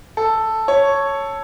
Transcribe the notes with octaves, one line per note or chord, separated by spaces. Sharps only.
A4
C#5